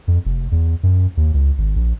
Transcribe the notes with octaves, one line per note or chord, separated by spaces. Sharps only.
F2
F1
E2
F#2
D#2
C#2
G#1
A#1